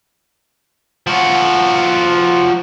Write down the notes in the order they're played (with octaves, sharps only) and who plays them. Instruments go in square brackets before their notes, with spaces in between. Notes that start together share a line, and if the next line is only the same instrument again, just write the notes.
[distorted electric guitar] F3 F#4